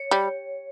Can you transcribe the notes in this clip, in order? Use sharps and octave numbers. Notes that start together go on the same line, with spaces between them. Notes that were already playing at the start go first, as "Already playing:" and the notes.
Already playing: C#5
G3